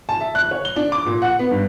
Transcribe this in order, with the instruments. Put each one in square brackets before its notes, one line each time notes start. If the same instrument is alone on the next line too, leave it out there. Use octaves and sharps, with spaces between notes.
[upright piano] A5
E5
F#6
C#5
G7
D4
D6
A#2
F#5
B3
G2